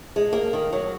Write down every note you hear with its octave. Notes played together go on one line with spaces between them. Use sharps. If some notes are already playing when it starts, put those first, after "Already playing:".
G#3
A#3
D#3
F#3